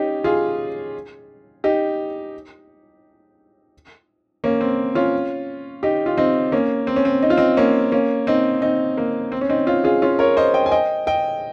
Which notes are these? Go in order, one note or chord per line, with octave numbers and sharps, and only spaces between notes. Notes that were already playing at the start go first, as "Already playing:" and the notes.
Already playing: C#4 D#4 G4
F4 G#4
D#4 G4
A#3 C#4
C4
C#4 F4
D#4 G4
F4
C4 D#4
A#3 C#4
C4
C#4
C4
D#4
F4
C4 D#4
A#3 C#4
A#3 C#4
C4 D#4
C4 D#4
A#3
C4
C#4
C4 D#4
C#4 F4
F4 G#4
C#4 F4
A#4 C#5
C5 D#5
D#5 G5
G#5
D#5 G5
D#5 G5